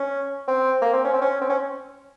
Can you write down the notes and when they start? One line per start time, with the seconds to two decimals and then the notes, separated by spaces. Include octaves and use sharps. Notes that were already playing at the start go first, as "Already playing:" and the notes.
Already playing: C#4
0.48 C4
0.82 A#3
0.94 C4
1.04 C#4
1.13 C4
1.22 C#4
1.41 C4
1.50 C#4